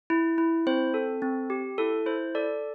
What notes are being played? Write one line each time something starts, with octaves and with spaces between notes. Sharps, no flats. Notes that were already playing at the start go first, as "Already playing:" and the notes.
E4
E4
C4 C5
A4
C4
G4
E4 A4
E4 C5
A4 D5